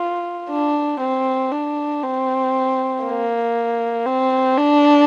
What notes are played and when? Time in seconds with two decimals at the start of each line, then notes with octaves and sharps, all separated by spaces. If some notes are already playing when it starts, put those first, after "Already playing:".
Already playing: F4
0.50 D4
1.00 C4
1.52 D4
2.03 C4
3.04 A#3
4.06 C4
4.58 D4